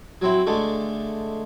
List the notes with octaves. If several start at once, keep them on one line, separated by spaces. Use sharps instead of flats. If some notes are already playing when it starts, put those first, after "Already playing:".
F#3 C4 E4
D3 G#3 A3